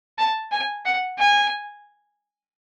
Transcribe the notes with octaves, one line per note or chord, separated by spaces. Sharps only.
A5
G#5
F#5
G#5